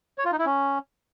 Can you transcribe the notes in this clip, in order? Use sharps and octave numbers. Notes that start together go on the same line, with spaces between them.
C#5
F4
D#4
E4
C#4